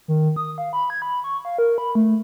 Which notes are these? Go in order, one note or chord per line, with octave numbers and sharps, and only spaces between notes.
D#3
D#6
F5
B5
G#6
B5
C#6
F5
A#4
B5
A3